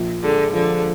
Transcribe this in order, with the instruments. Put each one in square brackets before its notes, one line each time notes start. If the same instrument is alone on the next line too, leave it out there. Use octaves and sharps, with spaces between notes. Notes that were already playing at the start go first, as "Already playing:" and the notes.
Already playing: [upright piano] A#1
[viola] D3 [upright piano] G#3
[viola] D3 [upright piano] F3